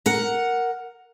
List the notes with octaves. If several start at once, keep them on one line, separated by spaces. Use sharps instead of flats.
A#4 F#5